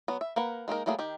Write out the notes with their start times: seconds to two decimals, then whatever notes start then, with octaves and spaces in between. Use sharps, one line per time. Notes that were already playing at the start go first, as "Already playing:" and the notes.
0.08 F#3 B3
0.21 E5
0.36 A#3 A#4 B4 F#5
0.68 G#3 A#3 D#4 A#4
0.86 F#3 G3 A3 A#3 G#4
0.99 D#3 G4